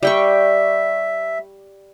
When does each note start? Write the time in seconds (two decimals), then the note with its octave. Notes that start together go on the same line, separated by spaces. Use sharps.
0.03 G3 E5 G5 C#6